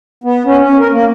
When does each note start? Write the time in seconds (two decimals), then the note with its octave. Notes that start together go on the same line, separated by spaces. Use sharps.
0.24 B3
0.46 C#4
0.61 C#4
0.79 A#4
0.92 A#3